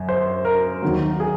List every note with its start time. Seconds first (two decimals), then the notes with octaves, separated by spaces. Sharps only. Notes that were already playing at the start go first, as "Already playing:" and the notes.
Already playing: F#2
0.09 C5
0.45 A#4
0.82 D#2 D#3 F#3
1.20 G#4